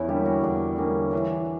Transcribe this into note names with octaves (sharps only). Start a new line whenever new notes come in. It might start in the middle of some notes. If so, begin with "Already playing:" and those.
Already playing: E2 C#4 E4
D3 G3 A#3 G4
F#4
E2 D4
D3 G3 A#3 C#4
E3 D4